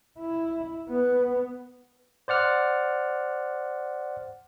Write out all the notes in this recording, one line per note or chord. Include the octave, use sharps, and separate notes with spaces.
E4
B3
C5 D5 F#5 F6